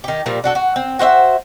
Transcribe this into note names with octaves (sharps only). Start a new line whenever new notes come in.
D#3 G4
A#2 F3 G3 A#3
D4 F#4 A4
F#4
C4
F#4 C5 D#5 E5